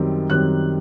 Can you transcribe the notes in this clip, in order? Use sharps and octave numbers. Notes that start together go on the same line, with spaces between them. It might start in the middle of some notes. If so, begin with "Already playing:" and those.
Already playing: F#2 D#3 G3 C4
F#2 D#3 G3 C4 F#6